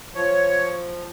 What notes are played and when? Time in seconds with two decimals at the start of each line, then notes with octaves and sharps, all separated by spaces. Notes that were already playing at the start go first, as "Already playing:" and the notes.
0.15 F3 C#5